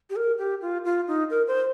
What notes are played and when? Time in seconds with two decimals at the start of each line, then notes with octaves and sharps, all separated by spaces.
0.10 G4
0.16 A#4
0.38 G4
0.62 F4
0.85 F4
1.08 D#4
1.30 A#4
1.47 C5